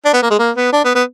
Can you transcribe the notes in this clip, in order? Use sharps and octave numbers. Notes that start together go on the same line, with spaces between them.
D4
B3
A#3
G#3
A#3
B3
D4
B3
B3